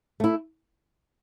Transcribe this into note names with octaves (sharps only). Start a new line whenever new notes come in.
A3 E4